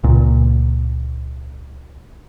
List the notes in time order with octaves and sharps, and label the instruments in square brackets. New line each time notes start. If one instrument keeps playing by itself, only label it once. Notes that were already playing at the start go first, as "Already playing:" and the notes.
[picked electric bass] C#2 A#2